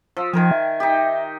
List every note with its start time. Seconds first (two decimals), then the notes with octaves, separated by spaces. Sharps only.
0.17 F3 E6
0.33 D#3 F3 A#4 G#5
0.51 E5
0.80 D#4 G4